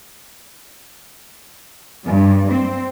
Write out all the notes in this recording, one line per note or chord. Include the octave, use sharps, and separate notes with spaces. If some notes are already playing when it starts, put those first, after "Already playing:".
G2
C4